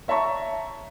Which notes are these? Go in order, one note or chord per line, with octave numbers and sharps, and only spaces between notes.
C#5 E5 A5 A#5 C#6